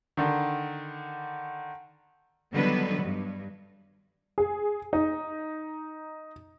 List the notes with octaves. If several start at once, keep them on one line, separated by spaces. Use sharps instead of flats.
D3 D#3
D3 D#3 F#3 G3 B3 B4
G2
G#4
D#4